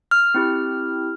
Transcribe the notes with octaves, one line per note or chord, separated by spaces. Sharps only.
F6
C4 E4 G4